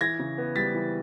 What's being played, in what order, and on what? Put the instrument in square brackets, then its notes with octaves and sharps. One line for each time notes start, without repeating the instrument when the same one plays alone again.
[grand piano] E3 G#6 A#6
C#3
B3
G3 A6 B6
E3